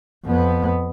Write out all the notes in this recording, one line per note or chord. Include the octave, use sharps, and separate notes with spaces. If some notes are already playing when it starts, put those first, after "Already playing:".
F2 B3